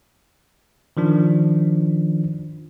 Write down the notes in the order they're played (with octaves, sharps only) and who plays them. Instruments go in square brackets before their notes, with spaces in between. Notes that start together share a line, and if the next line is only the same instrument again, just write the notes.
[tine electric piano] D#3 F3 D4